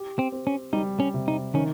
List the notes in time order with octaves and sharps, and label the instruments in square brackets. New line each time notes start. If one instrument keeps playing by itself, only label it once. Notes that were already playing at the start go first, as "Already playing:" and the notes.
Already playing: [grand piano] G4
[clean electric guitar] C4
[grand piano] C4
[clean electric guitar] C#4
[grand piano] G3 [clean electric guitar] D#4
[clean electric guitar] C#4
[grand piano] C3
[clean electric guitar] D#4
[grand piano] D#3 [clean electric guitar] C#4